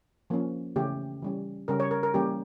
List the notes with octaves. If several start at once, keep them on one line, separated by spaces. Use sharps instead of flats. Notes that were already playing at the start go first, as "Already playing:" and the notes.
F3 A#3 C#4
C#3 E3 A3 C#4 G4
E3 G3 C#4
C#3 G3 C#4 A#4
C#5
A#4
A#4
E3 G3 A#3 C#4 G4